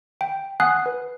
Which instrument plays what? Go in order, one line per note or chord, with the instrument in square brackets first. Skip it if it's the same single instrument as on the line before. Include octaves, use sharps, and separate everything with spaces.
[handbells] G5
F#5 G#5 D#6 F#6 C7
B4